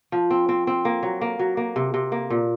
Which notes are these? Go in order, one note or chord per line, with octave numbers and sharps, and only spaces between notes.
F3
C4
C4
C4
A#3
F#3
A#3
F#3
A#3
C3
C3
A#3
A#2